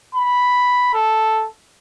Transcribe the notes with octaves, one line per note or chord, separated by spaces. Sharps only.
B5
A4